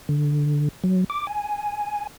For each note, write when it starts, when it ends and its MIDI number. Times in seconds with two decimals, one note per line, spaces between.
0.09 0.69 50
0.84 1.04 54
1.10 1.27 86
1.27 2.07 80